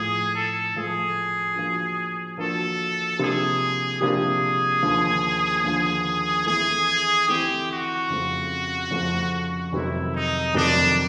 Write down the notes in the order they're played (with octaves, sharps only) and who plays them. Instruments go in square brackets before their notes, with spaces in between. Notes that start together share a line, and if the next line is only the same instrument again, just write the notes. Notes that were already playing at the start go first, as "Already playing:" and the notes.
Already playing: [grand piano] A2 F3 A3 [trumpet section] G#4
[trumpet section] A4
[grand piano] A2 F3 A3 [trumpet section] G#4
[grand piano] F3 A#3 D4 F#4
[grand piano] F3 A#3 D4 F#4 [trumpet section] A4
[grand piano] C3 F3 A#3 D4 G4 [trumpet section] G#4
[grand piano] C3 F3 A#3 D4 G4 [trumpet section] G#4
[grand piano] D#2 D3 F3
D#2 D3 F3
[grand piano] E3 A3 C4 E4 [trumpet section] G#4
[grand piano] E3 A3 C4 E4 [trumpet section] G4
[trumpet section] F#4
[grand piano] F2 C#3 F3 A3 C4
F2 C#3 F3 A3 C4
[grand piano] F2 C3 D#3 F#3 A3 [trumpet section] E4
[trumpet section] D#4
[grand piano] F2 C3 D#3 F#3 A3 [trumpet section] D4